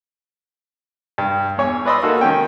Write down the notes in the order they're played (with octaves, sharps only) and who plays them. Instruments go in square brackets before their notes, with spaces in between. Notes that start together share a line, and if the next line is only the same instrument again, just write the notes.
[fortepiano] G2
E2 C#5 G#5
B4 D5 D#5 B5 C6 E6
A#3 D#4 F#4 A4
D#3 C#4 G5